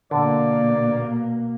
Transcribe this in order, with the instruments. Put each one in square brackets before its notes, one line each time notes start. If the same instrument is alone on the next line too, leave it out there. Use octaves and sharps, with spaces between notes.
[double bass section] B2 A#3 [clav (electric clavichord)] D3 [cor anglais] D5